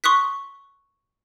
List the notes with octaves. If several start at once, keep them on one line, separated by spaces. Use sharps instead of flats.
C6 C#6 D#6 F#6 B6